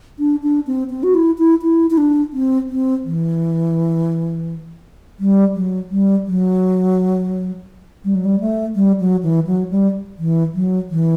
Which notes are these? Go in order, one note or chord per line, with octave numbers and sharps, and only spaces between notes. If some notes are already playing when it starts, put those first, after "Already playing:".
D4
D4
C4
C4
F#4
E4
E4
E4
E4
D4
C4
C4
E3
G3
F#3
G3
F#3
G3
F#3
G3
A3
G3
F#3
E3
F#3
G3
E3
F#3
E3